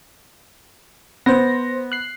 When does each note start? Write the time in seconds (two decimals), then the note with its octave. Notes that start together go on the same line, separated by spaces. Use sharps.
1.26 B3 C5 A#6
1.92 F#6 C7